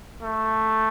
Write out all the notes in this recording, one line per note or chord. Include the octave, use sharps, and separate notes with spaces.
A3